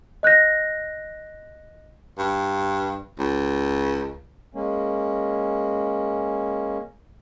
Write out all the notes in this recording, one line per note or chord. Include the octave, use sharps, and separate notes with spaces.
D#5 F#6 G6 A#6
G2
C#2
G#3 A#3 C#4